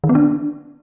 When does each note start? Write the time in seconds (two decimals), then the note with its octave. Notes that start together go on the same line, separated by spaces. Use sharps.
0.04 D#3
0.09 B3
0.15 D4